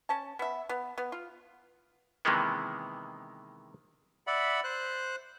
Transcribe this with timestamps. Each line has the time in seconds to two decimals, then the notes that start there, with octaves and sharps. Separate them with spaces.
0.09 C#4 A5
0.39 B3 E5
0.69 B3
0.98 B3
1.12 F4
2.25 C3 D#3 E3 G#3 A#3 B3
4.27 D5 E5 F#5 B5
4.64 C5 F#6